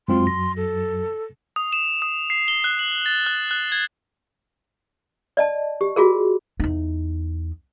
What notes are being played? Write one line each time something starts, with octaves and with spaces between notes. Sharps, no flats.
F#2 F#3 G#3 C4 F4 C6
A#6
A4
D#6
E7
D#6
C7
G7
F#6
F#7
A6
F#6
F#6
G#6
D5 D#5 A5
G4
F4 F#4 G#4 A#4
E2 D#4